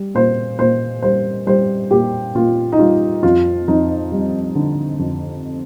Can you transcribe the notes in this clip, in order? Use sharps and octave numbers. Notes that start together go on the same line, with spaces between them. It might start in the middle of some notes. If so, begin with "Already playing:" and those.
Already playing: G3
A#2 C5
A#2 C5
G3 C5
G3 C5
A#2 G4
A#2 F4
D#4
G3 F4
F2 F4
F2 D#4
G3
D3
F2